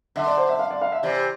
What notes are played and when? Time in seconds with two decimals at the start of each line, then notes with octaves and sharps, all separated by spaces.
0.16 D3 E5
0.27 D5
0.37 C5
0.49 E5
0.59 F5
0.71 D5
0.81 F5
0.92 E5
1.03 C3 E3 D5